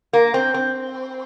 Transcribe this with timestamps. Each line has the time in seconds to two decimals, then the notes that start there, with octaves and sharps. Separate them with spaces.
0.13 A#3
0.34 C4
0.54 C4